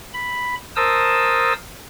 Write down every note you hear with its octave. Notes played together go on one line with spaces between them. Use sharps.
B5
A#4 C5 A5 D#6 E6